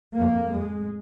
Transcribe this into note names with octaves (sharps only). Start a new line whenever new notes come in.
F2 A#3
F2 G#3